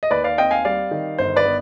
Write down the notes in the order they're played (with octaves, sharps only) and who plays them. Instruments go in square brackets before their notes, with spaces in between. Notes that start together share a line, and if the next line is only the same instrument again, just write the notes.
[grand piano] D#5
D#2 B4 D5
D5 F5
C4 D#5 G5
F5 G#5
G3 D5 F5
D#3
G1 C5
B4 D5
B3